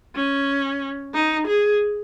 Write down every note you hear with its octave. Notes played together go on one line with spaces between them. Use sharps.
C#4
D#4
G#4